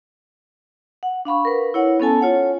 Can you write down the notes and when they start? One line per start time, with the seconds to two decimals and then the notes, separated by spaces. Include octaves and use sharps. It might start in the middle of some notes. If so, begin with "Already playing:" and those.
1.03 F#5
1.25 D4 F5 B5 C#6
1.45 A#4 B4
1.74 E4 C#5 F#5
2.00 B3 C#4 A4 G#5 A5
2.21 F4 C#5 F#5